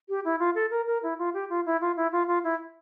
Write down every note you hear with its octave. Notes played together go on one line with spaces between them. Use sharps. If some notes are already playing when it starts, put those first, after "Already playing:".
G4
E4
F4
A4
A#4
A#4
E4
F4
G4
F4
E4
F4
E4
F4
F4
E4